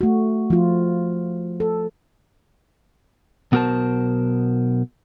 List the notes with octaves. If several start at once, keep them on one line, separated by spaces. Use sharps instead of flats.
A3 F#4
F3 F4
A4
B1 B3 F#4 A#4 C5 A5